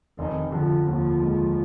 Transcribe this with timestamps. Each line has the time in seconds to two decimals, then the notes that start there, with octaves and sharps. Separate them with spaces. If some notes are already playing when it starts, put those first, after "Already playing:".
0.18 F1 D#3
0.52 D3 F3
0.86 D#2 F3
1.21 G#3